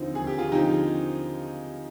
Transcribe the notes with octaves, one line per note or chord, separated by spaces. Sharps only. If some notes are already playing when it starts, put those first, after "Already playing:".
Already playing: D#2 D3 F3 C4 D#4
D#2 G#4
G4
F4 G#4
D3 F3 D#4 G4